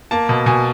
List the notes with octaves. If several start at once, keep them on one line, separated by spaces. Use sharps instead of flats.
A#3 A5
B2
B2 G#5